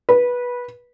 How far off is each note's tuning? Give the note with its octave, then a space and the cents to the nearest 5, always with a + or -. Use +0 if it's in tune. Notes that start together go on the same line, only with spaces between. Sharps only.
B4 -15